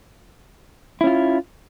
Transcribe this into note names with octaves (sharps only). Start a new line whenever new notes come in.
C#4 E4 F4